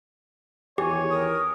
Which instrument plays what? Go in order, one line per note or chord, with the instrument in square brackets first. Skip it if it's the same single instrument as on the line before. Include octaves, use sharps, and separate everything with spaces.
[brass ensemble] E2 D#3 C#5 [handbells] G4 [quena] G#5
[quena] A#4 [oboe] D#6